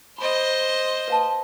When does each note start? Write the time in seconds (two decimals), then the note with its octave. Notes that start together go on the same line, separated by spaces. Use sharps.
0.18 C5 D#5 B5
1.08 B4 F5 A5